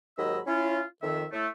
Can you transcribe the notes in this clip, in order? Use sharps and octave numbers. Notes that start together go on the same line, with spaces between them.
D#2 G#2 F#3 D#5 B5 E6
C#4 E4 F4
F2 D#3 E5
A2 A3